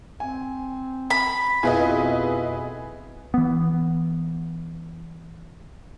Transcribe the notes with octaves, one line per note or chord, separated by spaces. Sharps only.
C4 G#5
B5
F2 B2 E4 F4 G#4 B4 D#5
E3 B3